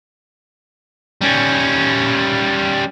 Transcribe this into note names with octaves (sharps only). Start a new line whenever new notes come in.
G3 C#4